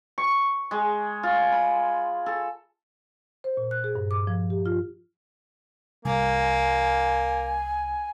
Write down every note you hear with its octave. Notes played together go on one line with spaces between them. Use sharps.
C#6
G#3
F4
B5
A4
C5
A#2
F#6
G#4
G2
D6
F3
G4
F4
C2 A#3 G#5